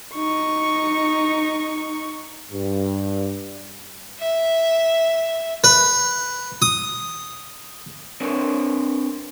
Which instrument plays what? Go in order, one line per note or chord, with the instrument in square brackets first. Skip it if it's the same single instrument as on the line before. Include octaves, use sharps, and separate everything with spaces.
[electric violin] D#4 C#6
[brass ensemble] G2
[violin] E5
[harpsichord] B4
D#6
[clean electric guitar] C4 D4 A#4 B4 C#5